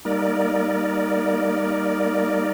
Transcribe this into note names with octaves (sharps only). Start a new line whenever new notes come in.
G3 A#3 D#4 A#4 D5